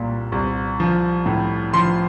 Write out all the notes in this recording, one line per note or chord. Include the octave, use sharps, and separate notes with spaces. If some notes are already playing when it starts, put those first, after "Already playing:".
Already playing: C2 A#2 G3
C2
F3
A2
F3 C6